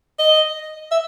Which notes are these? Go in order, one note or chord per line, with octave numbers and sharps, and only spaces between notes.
D#5
E5